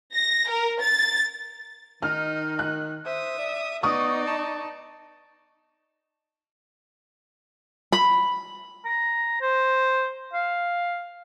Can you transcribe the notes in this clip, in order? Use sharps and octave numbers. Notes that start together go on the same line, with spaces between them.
A#6
A#4
A6
D#3 D#4 F6
F#6
C5 E5 D#6
D5
B3 D#4 D5 C#6 D#6
A5
B5
A#5
C5
F5